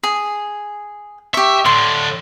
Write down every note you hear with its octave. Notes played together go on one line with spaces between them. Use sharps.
G#4
G4 E5 C#6
A2 D3 C6